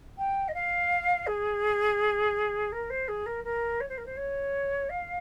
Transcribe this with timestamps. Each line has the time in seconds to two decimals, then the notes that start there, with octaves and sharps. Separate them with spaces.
0.18 G5
0.48 D#5
0.54 F5
1.27 G#4
2.72 A#4
2.90 C5
3.08 G#4
3.26 A#4
3.44 A#4
3.80 C#5
3.89 C5
3.98 A#4
4.06 C5
4.17 C#5
4.90 F5